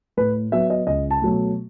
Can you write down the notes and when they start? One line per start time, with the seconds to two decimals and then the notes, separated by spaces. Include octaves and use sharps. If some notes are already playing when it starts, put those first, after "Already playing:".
0.17 A2 B4
0.52 F#3 B3 E5
0.70 D#5
0.86 C#2 D#5
1.11 A5
1.22 B2 F#3 A3